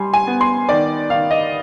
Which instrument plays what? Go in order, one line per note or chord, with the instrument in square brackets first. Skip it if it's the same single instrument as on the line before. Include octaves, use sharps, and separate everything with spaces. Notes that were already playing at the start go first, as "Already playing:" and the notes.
Already playing: [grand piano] G3 G#5 C6
G#5
B3
C6
D#3 D5
D#3 F5
D#5